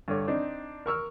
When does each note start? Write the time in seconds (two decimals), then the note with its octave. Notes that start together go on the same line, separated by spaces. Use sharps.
0.08 G2 D3 C#5
0.27 C4 D4 D#4
0.86 A#4 C#6 E6 F6